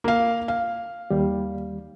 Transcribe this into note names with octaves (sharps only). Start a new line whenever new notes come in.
A#3 F5
F5
D#2 G3